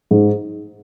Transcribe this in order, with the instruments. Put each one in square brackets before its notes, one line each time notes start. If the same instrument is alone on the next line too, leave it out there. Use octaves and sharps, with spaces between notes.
[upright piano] G#2